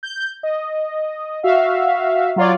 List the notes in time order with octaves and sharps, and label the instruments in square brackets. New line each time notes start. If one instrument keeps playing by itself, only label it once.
[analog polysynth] G6
D#5
F#4 E5 F5
F#3 F4 C#5 D5